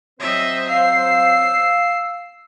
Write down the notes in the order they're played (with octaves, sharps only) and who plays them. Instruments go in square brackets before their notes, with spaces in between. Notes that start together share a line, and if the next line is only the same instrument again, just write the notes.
[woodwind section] F#3 C4 C5 [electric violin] D#5 E5
[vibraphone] F5 [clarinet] E6 [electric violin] C7